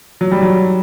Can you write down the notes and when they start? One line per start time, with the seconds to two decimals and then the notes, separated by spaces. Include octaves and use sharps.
0.21 F#3
0.32 G3
0.42 F#3